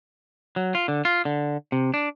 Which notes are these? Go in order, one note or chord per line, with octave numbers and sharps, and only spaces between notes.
F#3
F4
D3
F4
D3
C3
D4